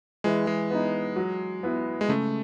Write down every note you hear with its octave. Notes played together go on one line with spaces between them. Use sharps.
E3 G#3
G#3
B3 D#4
F#3
B3 E4
G#3
C#3 A3